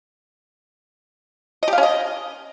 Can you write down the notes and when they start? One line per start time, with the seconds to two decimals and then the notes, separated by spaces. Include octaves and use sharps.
1.63 D#5
1.68 G4
1.73 F5
1.78 C#4
1.83 D#5